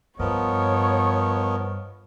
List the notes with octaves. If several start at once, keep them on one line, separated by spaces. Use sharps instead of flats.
G2 F3 B3 A#4 C#5 D#5